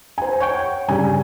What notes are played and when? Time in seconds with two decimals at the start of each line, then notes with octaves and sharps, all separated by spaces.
0.18 C5 G#5
0.40 C#5 F#5 G5 C#6
0.88 G2 C#3 G3 G#5